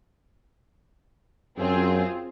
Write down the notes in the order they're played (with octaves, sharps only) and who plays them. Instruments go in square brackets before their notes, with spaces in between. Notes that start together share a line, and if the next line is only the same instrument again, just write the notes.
[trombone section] F#2 [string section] C4 F4 G#4